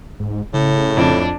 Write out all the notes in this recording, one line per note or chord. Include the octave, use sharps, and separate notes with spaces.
G#2
A2 C#3
F2 D4